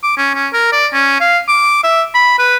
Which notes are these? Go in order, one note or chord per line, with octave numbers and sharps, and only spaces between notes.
D6
C#4
C#4
A#4
D5
C#4
F5
D6
E5
B5
B4